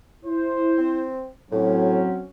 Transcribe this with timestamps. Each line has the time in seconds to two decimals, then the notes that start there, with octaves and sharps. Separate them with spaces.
0.25 E4 C5
0.78 C4
1.51 A2 F#3 C4 C#4